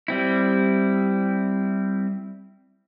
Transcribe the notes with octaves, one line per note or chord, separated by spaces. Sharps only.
G3 C4 E4